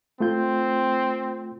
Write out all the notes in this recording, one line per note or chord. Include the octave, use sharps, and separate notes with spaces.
A3 C4 F4 G6